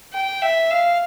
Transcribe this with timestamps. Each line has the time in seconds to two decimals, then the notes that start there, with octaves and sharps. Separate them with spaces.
0.13 G5
0.42 E5
0.71 F5